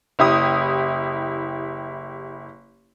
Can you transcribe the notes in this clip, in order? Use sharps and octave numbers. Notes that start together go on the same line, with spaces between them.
F#1 E4 G4 D#6